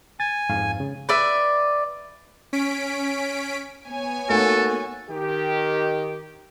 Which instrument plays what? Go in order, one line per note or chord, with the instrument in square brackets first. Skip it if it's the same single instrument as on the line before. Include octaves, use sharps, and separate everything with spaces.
[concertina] G#5 [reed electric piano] A6
[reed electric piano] F2 G#2 F5
C#3
[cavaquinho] B4 D5 E5
[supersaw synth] C#4 B6 D7
[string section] B3 C#5 G#5
[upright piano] A3 A#3 D#4 [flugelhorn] F#4 [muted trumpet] A4
[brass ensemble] D#3 G4